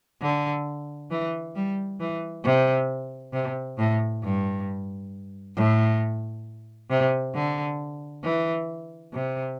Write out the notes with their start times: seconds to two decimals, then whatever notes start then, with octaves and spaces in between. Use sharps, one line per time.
0.22 D3
1.11 E3
1.55 G3
2.00 E3
2.44 C3
3.33 C3
3.78 A2
4.23 G2
5.56 A2
6.90 C3
7.34 D3
8.23 E3
9.13 C3